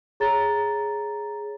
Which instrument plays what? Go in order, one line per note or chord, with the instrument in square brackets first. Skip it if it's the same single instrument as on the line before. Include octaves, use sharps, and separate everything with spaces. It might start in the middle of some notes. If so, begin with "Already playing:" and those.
[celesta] G#4 C#5 A#5 A6